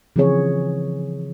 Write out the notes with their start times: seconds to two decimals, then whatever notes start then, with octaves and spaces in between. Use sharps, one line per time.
0.16 C#3 E3 F3 C4 G#4 C#5